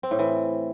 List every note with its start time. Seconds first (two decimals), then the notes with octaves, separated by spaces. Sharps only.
0.03 C4
0.11 A2
0.19 E3